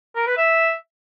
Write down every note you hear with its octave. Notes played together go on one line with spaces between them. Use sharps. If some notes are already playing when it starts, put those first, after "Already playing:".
A#4
B4
E5